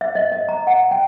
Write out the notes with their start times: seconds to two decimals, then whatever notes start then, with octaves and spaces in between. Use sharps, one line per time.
0.01 E5
0.15 D#5
0.32 D#5
0.49 A#5
0.67 F#5
0.91 G5